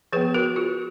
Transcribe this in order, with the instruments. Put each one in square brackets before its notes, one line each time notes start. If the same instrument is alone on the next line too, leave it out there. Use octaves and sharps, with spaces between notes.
[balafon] F3 G#4 B4
B3
F#4 A#4
F4 G#4